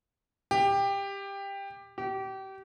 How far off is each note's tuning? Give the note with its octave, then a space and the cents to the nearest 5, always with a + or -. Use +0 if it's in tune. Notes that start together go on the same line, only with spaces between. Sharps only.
G4 +15
G4 -30